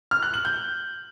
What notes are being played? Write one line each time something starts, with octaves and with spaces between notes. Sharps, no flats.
F6
F#6
F#7
G6